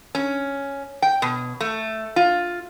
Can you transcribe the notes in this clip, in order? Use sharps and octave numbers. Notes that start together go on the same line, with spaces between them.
C#4
G5
B2
A3
F4